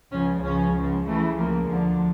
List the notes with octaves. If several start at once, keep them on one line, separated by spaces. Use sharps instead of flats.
C#2 C#3 F3 C#4
C#2 C#3 F3 C#4
C#2 C#3 F3
C#2 C#3 E3 A3
C#2 C#3 F3 A#3
D2 D3 F3